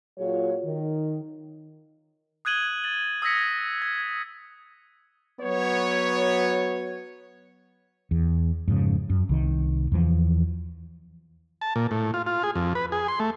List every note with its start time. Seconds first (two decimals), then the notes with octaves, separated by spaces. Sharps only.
0.18 A#2 F#3 F4 G#4 C#5
0.65 D#3
2.45 D#6 F#6 G#6 D#7 F#7 G7
2.84 A6 F#7
3.22 D#6 E6 G#6 A#6 B6 C#7
3.82 G#6
5.40 F#3 B3 C#5
8.11 E2
8.68 F2 G#2 C#3
9.10 F#2
9.29 C2 D#3
9.92 E2 E3 F3
11.61 A5
11.76 A#2
11.91 A2
12.14 F4
12.27 F4
12.43 G#4
12.55 F2
12.75 B4
12.92 G#4
13.08 C6
13.20 A3